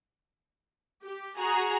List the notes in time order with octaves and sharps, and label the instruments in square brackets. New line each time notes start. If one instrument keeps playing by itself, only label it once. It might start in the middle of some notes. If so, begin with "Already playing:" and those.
[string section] G4
F#4 G#4 A#5